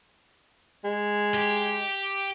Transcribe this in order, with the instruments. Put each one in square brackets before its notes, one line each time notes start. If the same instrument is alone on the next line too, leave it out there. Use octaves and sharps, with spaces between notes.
[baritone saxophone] G#3
[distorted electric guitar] G4